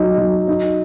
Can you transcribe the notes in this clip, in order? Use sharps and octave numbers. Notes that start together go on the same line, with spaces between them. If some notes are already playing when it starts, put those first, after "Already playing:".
Already playing: F#3 D#4
F#3
D#4